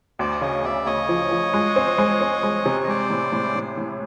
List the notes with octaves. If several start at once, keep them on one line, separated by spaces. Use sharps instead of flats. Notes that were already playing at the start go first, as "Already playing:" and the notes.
D2 C5 D5
C#3 C#5 D#5
D2 D5 E5
D2 C#5 D#5
F3
F3
G#3
C4
G#3
C4
G#3
C3
D#5
G#3 C5 D5
A2
A2
A2
A2